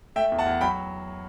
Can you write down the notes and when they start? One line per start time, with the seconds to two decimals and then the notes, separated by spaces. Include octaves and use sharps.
0.16 A3 E5 G5
0.32 E2
0.39 F#5 A5
0.46 E2
0.61 F#3 G5 B5